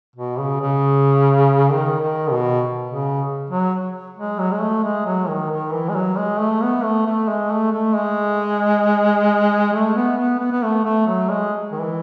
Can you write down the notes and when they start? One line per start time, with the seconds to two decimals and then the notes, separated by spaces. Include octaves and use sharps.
0.16 B2
0.38 C#3
0.60 C#3
1.71 D#3
2.01 D#3
2.31 B2
2.90 C#3
3.50 F#3
4.17 G#3
4.39 F#3
4.51 G#3
4.61 A3
4.84 G#3
5.06 F#3
5.29 D#3
5.51 D#3
5.73 E3
5.89 G#3
5.95 F#3
6.17 G#3
6.39 A3
6.62 B3
6.84 A3
7.06 A3
7.28 G#3
7.51 A3
7.72 A3
7.96 G#3
9.73 A3
9.96 B3
10.17 B3
10.39 B3
10.52 B3
10.63 A3
10.84 A3
11.07 F#3
11.29 G#3
11.72 D#3
11.81 E3